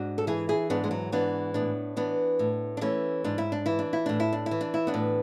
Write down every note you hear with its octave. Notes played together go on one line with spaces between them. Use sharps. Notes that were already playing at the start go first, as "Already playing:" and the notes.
Already playing: G#2 D4 F#4
A4
E3 E4 G#4
E4 G#4
G#2 B3 D4
G#3
F#3
E3 B3 D4
A2 B3 D4
E3 B3 D4
A2
D4
E3 A3 C#4
G#2 D4
E4
D4
E3 E4
D4
E4
A2 D4
E4
D4
E4
E3
D4
E4
B3 D4
A2